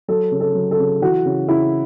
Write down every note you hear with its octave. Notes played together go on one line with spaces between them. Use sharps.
F#3 A4
C#3
A4
F#3
A4
C#3
E3 F#4
C#3
C#3 E4